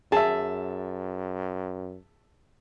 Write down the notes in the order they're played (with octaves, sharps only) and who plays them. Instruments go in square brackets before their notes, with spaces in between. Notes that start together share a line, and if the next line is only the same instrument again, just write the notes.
[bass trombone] F#2 [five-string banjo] G#4 [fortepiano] E5 A5